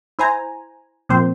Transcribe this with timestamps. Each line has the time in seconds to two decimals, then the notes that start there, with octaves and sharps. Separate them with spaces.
0.19 E4 C5 G#5 A#5
1.09 A#2 F3 A#3 C4 C5